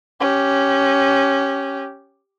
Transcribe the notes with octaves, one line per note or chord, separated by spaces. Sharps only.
C#4 G4